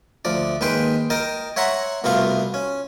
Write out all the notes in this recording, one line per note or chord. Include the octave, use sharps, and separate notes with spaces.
D2 F3 D5
D#2 G#3 B4 G5 C6
A#4 D#5 G5 A5
C#5 E5 F#5 A#5 C6 C#6
C2 B2 A3 B3 F4 F5
C#4